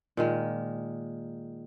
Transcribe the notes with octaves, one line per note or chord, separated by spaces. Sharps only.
A#2 D#3 G#3